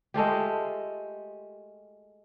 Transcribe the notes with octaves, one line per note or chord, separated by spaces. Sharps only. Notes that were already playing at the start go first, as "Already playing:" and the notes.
G#3 A3 F4 G4